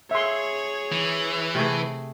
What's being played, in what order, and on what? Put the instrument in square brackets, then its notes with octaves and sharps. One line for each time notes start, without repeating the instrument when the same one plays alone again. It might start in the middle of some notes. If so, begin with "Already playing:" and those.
[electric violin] G#4 C#5 [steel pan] E5 C6
[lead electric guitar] E3
[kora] C3 A3 G#4